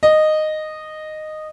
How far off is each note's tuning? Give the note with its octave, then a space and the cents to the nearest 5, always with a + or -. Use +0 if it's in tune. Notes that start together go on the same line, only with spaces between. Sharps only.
D#5 -10